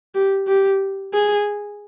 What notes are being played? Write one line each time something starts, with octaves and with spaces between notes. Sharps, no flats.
G4
G4
G#4